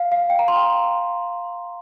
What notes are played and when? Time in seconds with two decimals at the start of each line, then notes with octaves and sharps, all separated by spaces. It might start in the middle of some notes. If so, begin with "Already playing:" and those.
Already playing: F5
0.12 F5
0.30 G5
0.39 A#5
0.48 C6